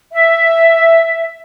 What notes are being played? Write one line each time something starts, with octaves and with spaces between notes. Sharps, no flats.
E5